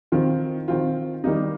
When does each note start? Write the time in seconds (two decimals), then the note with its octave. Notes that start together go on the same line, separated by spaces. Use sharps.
0.12 D#3 C4 F4
0.68 D#3 C4 F4
1.24 D#3 G3 A#3 D#4